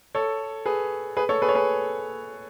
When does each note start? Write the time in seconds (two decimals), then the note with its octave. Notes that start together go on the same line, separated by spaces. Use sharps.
0.15 A4 C#5
0.66 G#4 B4
1.17 G#4 B4
1.29 A4 C#5
1.42 G#4 B4
1.49 C#5
1.55 G#4 B4